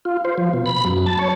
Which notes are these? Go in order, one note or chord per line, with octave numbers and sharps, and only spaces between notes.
F4
C5
F3
B2
B5
F#2
A5
C#5